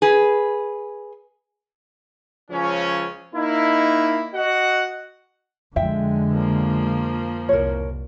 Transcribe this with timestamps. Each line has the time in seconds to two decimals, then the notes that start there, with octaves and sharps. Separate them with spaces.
0.02 G#4 B4
2.51 C#2 F3 C#4
3.35 A#3 D#4 E4
4.35 F#4 D#5 F#5
5.76 F2 D3 G#3 E5 G5
6.33 F3 A#3
7.49 C2 A#4 C#5